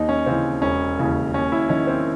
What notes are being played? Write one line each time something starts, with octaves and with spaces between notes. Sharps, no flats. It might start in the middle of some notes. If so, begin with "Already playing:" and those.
Already playing: D#2 D#4
C#4
C#3 E3 C4
E1 C#4
D#2 C#3 E3
D#2 C#4
E4
D#3 C#4
C4